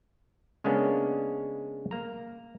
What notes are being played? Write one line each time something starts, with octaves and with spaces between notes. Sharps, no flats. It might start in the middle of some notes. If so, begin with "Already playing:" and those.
C#3 G#3 A#3 B3 C#4 D4
A#3 A#5